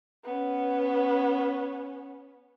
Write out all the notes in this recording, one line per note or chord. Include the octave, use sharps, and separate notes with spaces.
B3 C#4